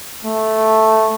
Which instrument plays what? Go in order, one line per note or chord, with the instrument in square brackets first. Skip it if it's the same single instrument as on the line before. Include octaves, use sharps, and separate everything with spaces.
[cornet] A3